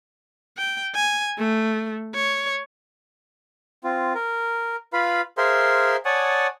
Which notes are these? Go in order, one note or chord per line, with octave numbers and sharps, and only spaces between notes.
G5
G#5
A3
C#5
C4 F4
A#4
F4 B4 F5 B5
G#4 A#4 C5 E5 F5 C6
C#5 D5 F#5 G#5 A5 D#6